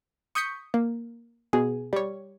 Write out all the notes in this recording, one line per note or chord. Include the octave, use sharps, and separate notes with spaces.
C#6 D#6 G6 B6 C#7
A#3
B2 G#4
G3 C#5